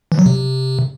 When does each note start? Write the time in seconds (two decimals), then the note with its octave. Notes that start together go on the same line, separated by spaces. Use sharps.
0.12 E3
0.19 F#3
0.26 C3